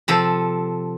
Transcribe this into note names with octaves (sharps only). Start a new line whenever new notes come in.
C3 F3 A4